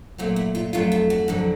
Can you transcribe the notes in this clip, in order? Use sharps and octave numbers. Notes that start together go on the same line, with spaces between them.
A#2 F#3 A3 C4
E4
F4
F2 D3 F#3 A3 F4
F4
F#4
F2 D3 F#3